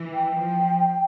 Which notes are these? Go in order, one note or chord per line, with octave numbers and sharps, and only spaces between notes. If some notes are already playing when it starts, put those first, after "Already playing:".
Already playing: E3
G5
F3